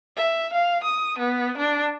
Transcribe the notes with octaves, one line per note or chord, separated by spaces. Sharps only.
E5
F5
D#6
B3
D4